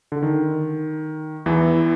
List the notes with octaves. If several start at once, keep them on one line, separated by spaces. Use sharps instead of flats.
D3
D#3
E2 E3